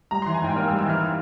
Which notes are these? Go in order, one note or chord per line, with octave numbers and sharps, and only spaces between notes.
G3 A#5
E3 C6
G#5
G#2 G5
A#3 F6
E6
G3
E6
E3 F6
E6